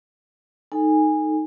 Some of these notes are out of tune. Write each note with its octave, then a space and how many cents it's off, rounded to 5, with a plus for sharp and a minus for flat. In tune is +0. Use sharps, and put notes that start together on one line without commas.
D#4 +0 A4 +0 G#5 -15